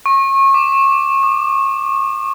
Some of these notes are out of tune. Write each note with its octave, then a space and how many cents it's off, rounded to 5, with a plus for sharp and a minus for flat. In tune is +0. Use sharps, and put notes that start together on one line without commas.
C#6 -30
D6 -20
D6 +35